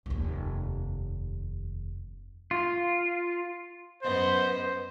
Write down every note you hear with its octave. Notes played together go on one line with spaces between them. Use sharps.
F1 D#2
F4
F#2 B3 C5 D#5